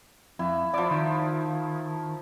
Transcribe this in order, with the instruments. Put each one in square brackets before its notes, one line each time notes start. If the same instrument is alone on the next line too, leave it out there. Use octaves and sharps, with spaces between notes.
[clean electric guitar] F2 [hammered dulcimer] E4
[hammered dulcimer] F3 E4 [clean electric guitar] D5
[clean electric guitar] D#3